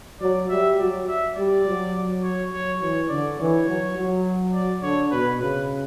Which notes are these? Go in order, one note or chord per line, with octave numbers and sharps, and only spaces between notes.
F#3 D5
G3 E5
F#3 D5
E5
G3 D5
F#3
C#5
F#3 C#5
E3 C#5
D3 D5
E3 C#5
F#3
F#3
D5
D3 C#5
B2 B4
C#3 B4